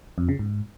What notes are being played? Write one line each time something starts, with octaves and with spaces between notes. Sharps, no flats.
F2
C#3
G#2